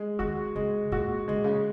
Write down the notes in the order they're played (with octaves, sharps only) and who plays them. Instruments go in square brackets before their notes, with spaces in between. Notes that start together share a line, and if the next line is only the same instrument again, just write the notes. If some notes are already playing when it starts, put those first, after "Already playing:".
Already playing: [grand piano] G#3
[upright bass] D#3 [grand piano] F#4
[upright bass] C#3 [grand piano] G#3
[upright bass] A#2 [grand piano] F#4
[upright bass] C#3 [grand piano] G#3
[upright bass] A#2
C#3